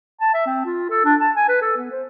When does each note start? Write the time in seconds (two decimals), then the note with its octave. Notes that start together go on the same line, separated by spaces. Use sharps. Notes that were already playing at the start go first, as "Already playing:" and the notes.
0.21 A5
0.34 E5
0.46 C4
0.66 F4
0.90 A4
1.05 D4
1.21 A5
1.36 G#5
1.49 B4
1.62 A4
1.77 B3
1.92 C5